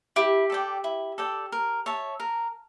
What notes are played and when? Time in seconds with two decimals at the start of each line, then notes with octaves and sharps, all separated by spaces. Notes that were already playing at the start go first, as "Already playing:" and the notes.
0.16 E4 G4
0.50 A4 D5 G5
0.84 E4
1.18 A4 D5 G5
1.52 A#4
1.86 C#5 E5 A5
2.20 A#4